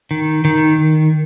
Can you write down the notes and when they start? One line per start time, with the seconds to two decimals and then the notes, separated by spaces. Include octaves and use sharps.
0.11 D#3
0.45 D#3